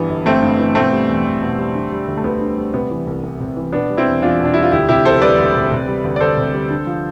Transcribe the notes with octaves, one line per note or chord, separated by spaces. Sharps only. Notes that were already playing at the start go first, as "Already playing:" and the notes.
Already playing: G2 E3 G3 B3
G1
G1 A3 C4
G2
E3
B2 A3 C4
G3
E2
E2
B2
G3
D3
G3
D2
A3
D2 B3
D3
G3
C3 B3
E3
C2
C2
C3
E3
B2 B3 D4
G3
C4 E4
E2
E2 D4 F4
B2
D4
G3 E4
F4
D2 E4 G4
C3 E4 G4
E1 A4 C5
G3 B4 D5
D2
C3
C3
G3
D2
D5
D2 A4 C5
C3
G3
D3
F3